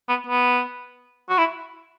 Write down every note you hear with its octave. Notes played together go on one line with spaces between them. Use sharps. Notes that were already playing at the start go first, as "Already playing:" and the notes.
B3
B3
F#4
E4